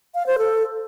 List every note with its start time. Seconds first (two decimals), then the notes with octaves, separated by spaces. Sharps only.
0.15 F5
0.26 C5
0.38 A4